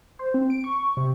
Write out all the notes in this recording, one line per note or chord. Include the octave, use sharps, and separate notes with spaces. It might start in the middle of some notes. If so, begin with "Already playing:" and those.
C5
C4
D7
C#6
C3